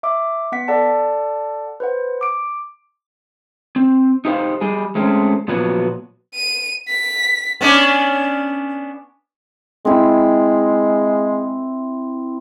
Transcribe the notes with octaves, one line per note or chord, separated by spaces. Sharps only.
E5 D6
B3 F#5 B6
A4 D5 F#5 A5
B4 C5 F#5
D6 D7
C4
D#4 G4 C5 F5
G3 G#4
G#3 A3 C4 C#4
A#2 F3 F#3 B3 F#4
D#7
B6
B3 C#4 D4
G#3 C4 E4